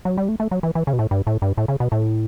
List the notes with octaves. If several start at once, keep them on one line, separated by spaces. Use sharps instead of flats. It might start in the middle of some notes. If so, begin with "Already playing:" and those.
F#3
G3
A3
A3
F#3
E3
E3
C#3
B2
A2
G2
A2
G2
A2
C#3
B2
A2